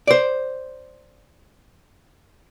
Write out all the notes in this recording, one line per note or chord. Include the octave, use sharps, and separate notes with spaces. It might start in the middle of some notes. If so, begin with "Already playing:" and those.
C5 D5